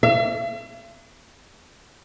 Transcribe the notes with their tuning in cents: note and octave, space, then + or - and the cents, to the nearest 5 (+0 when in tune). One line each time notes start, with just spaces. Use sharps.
E5 +45